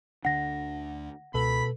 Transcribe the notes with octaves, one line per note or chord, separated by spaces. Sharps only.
D2 D3 D4 F#5 A#6
C#2 B2 A4 B4 B5